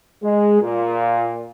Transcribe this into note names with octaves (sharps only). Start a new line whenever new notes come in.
G#3
A#2